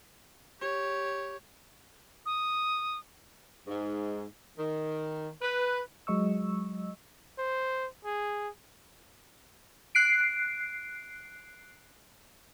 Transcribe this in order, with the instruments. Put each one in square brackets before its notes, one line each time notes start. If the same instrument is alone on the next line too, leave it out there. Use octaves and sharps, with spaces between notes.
[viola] G4 C#5
[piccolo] D#6
[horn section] G#2
D#3
B4
[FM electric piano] F#3 G#3 D#5 C#6 E6
[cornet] C5
G#4
[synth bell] F#6 C7 D7